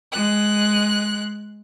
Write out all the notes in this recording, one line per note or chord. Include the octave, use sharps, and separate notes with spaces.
G#3 F#6